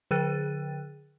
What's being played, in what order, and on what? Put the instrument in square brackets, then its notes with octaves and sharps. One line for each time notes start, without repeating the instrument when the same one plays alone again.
[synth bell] D3 G#4 G5 F#6 A6 D#7